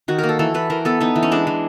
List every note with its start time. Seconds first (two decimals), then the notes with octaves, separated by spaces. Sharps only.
0.08 D#3 F#4
0.18 A#3 A#4
0.29 A4
0.39 E3 A4
0.54 E3 B4
0.70 E3 A#4
0.85 B3 A4
1.01 B3 D#4
1.16 E3
1.23 C#4
1.32 G#3 D4
1.47 E3